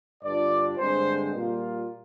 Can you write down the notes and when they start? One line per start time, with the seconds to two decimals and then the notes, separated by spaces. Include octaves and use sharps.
0.23 G2 D3 G3 D4 F4 D5
0.78 G2 D3 G#3 C4 C5
1.32 A#2 G3 A#3 F4